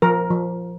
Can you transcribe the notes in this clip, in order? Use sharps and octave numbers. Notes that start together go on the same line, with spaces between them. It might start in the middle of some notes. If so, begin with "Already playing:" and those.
F3 A#4
F3